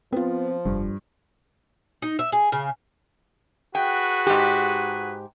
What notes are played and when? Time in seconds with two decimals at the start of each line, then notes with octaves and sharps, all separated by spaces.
0.13 F3 B3 C4 F4
0.66 F1 G2
2.02 D#4
2.19 E5
2.32 G#4
2.52 C#3
3.75 F#4 G#4 B4 G5
4.27 G#2 G4